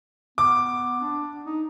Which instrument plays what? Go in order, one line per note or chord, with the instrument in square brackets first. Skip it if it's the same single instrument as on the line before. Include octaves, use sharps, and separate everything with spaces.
[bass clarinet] B3 [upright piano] D6
[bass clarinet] D4
D#4